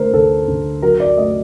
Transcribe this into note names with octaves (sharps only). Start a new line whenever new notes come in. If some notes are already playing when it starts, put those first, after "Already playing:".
Already playing: D3 A3 A#4 C5
D2 A4
D2
F#3 A#4
D5
A3 D#5